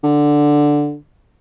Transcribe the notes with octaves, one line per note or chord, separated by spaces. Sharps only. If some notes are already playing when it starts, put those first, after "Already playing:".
D3